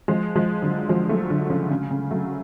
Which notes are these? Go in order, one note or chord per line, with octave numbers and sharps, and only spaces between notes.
F3 G#3
F3 G#3
D3 F#3
F3 G#3
F#3 A3
D3 F#3
C#3 F3
C#3
C#3
F#3 A3